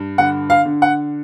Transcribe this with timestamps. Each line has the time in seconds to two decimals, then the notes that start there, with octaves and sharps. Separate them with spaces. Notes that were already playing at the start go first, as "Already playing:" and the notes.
Already playing: G2
0.18 D3 F#5
0.50 F5
0.66 D3
0.82 F#5